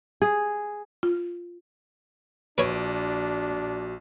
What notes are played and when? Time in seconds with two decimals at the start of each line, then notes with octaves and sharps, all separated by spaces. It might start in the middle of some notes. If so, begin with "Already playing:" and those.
0.22 G#4
1.03 F4
2.58 A#1 D4 F#4 B4 C#5 D7 D#7